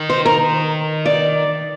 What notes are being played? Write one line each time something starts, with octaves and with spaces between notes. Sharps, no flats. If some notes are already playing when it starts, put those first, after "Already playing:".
Already playing: D#3
C5
A#4
D5